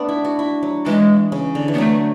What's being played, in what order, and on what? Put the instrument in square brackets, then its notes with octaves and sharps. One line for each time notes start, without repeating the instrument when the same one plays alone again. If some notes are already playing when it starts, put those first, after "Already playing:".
Already playing: [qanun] A3 B3 D4
E4
F#4
E4
F#3
[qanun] E3 [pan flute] G#3
[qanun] C#3
D3
E3
[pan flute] B3
[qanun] F#3 [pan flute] A3